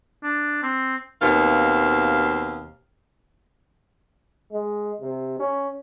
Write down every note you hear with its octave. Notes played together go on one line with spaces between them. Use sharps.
D4
C4
D#2 B2 C4 F5
G#3
C3
C#4